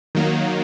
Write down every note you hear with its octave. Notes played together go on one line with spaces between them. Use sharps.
D#3 F#3 A#3